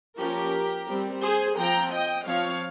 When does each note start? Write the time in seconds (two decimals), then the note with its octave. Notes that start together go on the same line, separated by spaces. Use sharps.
0.18 F3 A#3 C#4 G4 A#4
0.89 G3 C4
1.23 G#4 C5
1.58 F3 C4 G5 A#5
1.92 D#5 G5
2.27 F3 C4 C#5 F5